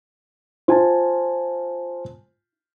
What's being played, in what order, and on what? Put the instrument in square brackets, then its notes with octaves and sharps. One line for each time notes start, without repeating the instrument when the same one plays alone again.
[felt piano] F4 [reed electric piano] C5 G#5 A5